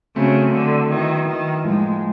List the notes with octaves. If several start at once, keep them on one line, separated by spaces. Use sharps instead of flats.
C#3 F#3 A3 C4
D3
D#3 F#3 B3 E4
D#3
A2 F3 G#3 A#3 D#4